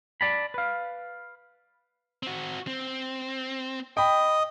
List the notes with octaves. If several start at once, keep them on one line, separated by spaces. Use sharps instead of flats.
D5 A5 B5
B4 F5
C4 F#4
C4
D#5 G5 B5